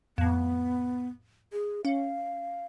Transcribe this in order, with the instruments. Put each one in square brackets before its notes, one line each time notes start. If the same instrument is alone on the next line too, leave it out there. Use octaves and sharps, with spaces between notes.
[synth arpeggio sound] F2 A2 [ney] B3
[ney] G#4
[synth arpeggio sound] C#4 [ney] F5